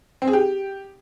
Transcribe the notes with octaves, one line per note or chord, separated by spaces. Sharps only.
C4
G#4
G4